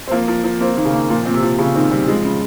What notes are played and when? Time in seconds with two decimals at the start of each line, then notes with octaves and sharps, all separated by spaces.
0.08 C4
0.11 F3 A#3
0.28 F3
0.44 F3
0.60 A#3 C4
0.77 D#3 A#3
0.85 C#3
0.94 A#3
1.10 A#2 F3
1.26 A#2 C4
1.34 C3
1.43 F3
1.59 C#3 F3
1.75 D#3 C4
1.91 G3 C4
2.07 F3 G#3
2.25 C#3